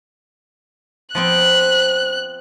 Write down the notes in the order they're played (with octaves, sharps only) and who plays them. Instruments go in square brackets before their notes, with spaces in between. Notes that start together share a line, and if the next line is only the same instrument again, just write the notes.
[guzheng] F3 B3 C4 [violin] F#6